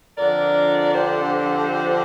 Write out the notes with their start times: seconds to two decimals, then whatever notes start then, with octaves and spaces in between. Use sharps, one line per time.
0.17 F2 D3 F3 D4 A#4 D5
0.93 G4 C5